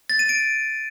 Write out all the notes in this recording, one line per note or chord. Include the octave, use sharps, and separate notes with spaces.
A6
D#7
D7